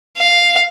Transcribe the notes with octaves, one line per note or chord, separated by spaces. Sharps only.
F5